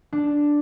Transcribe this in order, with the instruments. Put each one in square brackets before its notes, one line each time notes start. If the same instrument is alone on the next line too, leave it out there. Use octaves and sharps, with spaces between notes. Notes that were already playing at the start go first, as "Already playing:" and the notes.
[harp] D4